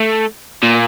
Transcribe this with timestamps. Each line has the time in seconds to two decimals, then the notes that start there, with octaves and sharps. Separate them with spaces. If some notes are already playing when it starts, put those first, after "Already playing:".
Already playing: A3
0.63 A#2